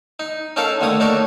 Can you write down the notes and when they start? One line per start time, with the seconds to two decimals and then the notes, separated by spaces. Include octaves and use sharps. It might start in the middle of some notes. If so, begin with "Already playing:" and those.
0.19 D#4
0.56 C#4 D#4 A4 A#4 F5
0.81 D#2 D3 A3 C#5 D#6
1.00 D4 D#4 A4 A#4 C#5